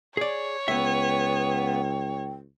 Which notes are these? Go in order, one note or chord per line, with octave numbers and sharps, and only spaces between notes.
G#4 C#5 D5
C#2 B3 E5 G5